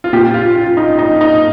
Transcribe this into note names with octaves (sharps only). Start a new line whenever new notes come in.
F4
A#2 G4
F4
F4
D#4
D#4
D#4